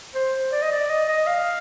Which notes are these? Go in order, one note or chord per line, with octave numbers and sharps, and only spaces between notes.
C5
D5
D#5
D5
D#5
D#5
F5